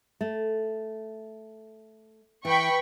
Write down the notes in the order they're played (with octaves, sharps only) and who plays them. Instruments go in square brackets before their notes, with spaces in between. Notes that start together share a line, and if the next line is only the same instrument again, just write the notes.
[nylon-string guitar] A3
[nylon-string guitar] E3 [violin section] G5 B5 C#6